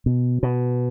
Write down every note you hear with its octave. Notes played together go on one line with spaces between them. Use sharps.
B2
B2